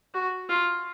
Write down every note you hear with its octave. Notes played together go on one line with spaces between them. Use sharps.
F#4
F4